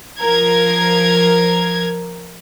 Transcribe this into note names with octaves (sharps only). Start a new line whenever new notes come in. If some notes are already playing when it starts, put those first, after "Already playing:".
F3 A#4 G#6